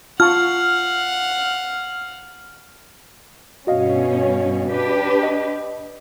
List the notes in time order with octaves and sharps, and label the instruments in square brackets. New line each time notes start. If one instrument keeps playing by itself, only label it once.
[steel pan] F4 A5 C#6 [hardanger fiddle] F5 F#5 [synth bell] F6
[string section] G2 B2 C#4 [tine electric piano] F#4 D#5 F5
[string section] D4 G4 B4
[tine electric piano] D#5